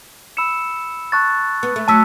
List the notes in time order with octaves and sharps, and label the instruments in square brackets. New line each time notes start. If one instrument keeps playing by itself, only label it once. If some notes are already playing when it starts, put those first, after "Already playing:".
[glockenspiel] B5 E6 C#7 E7
A5 C#6 F#6 A6
[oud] B3
A3
[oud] F#3 [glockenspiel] A5 E6 B6